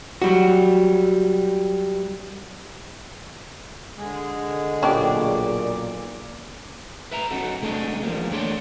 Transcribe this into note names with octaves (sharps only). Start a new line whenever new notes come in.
F#3 G3 F#4
D3 G#3 G#4
B1 A#2 C#4 D4 G4 D5
B4 E5 A#5
B3 C#4 D#4 F#4 A4
C2 G#3 A3 D4 D#5
E2 C3 F3 G3 A#3
A3 D4 C#5 D5 F5 C6